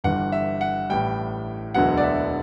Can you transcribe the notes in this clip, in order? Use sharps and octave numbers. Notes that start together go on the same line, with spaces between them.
G1 G2 E3 F#5
E5
F#5
A1 A2 G3 G5
E1 D2 D3 F#3 B3 F#5
D5
E5